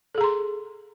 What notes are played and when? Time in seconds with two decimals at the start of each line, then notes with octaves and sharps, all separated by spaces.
0.15 A4
0.18 G#4
0.21 A#5
0.24 C6